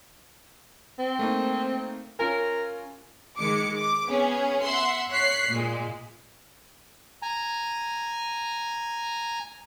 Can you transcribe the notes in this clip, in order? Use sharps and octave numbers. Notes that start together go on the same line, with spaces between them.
C4
A3 A#3 D#4
C#4 F4 A#4 G#5
D#3 G#3 D6 C#7
D6
B3 C#4 G#4
E5 F#5 C6
C#5 F#6 B6 C7
A#2 G#3
G#5 A#5